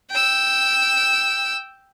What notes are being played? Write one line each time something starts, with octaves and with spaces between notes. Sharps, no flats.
G5 E6